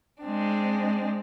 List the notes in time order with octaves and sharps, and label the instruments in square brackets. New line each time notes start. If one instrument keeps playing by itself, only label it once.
[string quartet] G#3 C4 D4